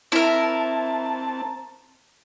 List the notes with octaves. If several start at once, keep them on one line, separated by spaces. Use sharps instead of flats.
C4 E4 A#4 A5